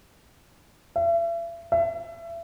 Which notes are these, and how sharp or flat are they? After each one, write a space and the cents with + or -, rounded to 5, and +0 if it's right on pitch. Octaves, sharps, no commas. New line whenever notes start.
E5 +40
E5 +30